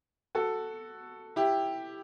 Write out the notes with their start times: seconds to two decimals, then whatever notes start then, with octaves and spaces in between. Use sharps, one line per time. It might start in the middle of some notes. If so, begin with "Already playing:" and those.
0.35 F#4 A4
1.36 E4 G4